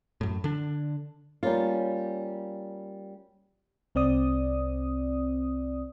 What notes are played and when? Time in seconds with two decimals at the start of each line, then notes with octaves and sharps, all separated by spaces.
0.21 F#2 A2
0.44 D3 D4
1.43 G3 A#3 C#4 F4
3.95 C2 C4 D5 D#6